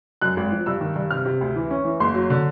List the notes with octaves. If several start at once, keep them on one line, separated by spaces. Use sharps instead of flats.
F#2 F#6
G#1
F3
G2 E6
D#3
G2
C3 F6
C3
D2
E3
C#4
E3
F#1 C6
F#3
D3